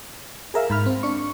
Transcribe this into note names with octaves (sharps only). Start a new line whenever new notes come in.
G#4 A#4 E5 F5
G#2 B5 F6
C4
D4 C#6